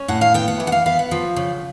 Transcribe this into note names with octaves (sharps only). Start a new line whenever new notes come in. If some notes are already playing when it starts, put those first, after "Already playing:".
Already playing: C#4
A2 F#5
F5
B3 G5
F#5
E3
F#5
F5
B3 F5
F#5
F3
C#3